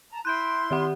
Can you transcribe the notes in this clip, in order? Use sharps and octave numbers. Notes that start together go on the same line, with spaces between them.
A5 A#5
E4 C6 F#6 G6 D7
D#3 G4 F#5